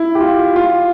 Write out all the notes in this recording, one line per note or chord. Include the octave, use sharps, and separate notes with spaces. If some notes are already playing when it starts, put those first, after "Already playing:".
Already playing: E4
G4
F4
F4